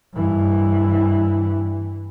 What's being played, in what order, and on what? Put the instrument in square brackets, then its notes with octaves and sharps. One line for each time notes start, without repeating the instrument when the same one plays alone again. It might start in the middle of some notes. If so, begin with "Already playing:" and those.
[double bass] G2 E3